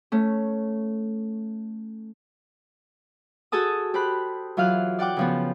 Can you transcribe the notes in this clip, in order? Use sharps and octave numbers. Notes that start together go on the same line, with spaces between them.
A3 C#4
F#4 G#4 A4 A5 D#6
G4 C5 B5 F#6
E3 F#3 F4 F5 F6 F#6
D5 F#5 G5 D6
C#3 F3 B3